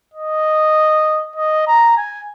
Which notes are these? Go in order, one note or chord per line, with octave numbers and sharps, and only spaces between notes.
D#5
D#5
A#5
G#5